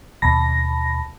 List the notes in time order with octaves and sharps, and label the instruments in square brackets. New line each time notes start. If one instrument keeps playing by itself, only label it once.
[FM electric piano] D#2 B2 A5 B5 A#6